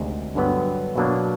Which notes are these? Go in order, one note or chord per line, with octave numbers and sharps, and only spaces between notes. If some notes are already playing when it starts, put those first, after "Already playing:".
Already playing: D2 C3 D#3 G#3
G2 D3 F#3 B3
B2 F#3 A#3 D4